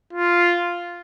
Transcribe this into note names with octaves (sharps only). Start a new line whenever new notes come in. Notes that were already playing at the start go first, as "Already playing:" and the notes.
F4